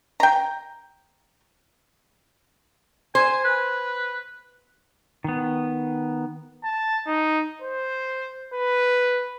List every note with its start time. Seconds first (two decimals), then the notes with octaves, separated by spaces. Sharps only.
0.20 G5 A#5
3.15 C5 G#5
3.44 B4
5.24 D#3 B3
6.64 A5
7.07 D#4
7.62 C5
8.53 B4